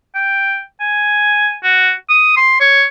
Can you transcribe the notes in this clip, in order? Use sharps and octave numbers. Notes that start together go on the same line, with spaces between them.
G5
G#5
F#4
D#6
C6
C#5